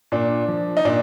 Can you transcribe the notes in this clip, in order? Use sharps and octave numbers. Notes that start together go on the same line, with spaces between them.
A#2 D4
F3
D#4
A#2 D4